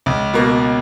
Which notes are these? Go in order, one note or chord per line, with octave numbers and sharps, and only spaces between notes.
C#2
B2 A#3